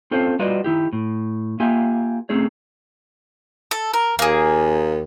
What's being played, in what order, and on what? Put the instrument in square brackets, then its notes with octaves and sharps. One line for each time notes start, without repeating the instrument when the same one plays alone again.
[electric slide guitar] C4 C#4 F4 A4 C5 C#5
G3 F4 F#4 B4 D5 D#5
D#3 E4 G4
A2
A#3 F4 G4 E5 G#5
A3 C4 C#4 G#4 C#5
[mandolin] A4
A#4
[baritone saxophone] D#2 [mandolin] A#3 G#4